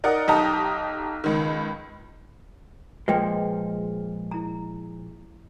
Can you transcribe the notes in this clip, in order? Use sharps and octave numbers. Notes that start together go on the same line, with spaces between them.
D#4 A#4 D5 D#5 F#5
B1 D#4 G4 A5 A#5 D#6
C#2 D#3
A#2 F3 G#3 B4 G5
E4 A#5